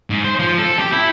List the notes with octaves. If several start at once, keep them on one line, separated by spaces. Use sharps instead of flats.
G#2
C5
F3
A4
G4
E4